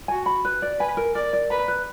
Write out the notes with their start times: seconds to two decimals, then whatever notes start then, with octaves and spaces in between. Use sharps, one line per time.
0.08 F#4 G#5
0.26 B5
0.45 B4
0.62 D5
0.79 B4 G#5
0.97 A#4
1.15 A#4 D5
1.33 D5
1.50 B4 A#5
1.68 B4